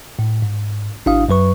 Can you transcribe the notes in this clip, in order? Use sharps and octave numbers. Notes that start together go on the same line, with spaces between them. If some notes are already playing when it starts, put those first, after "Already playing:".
A2
G#2
G#1 D4 E4 F5 D#6
F#2 F#3 B4 C#6